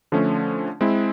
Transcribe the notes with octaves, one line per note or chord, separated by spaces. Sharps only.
D3 F3 A3 C#4
G#3 C4 E4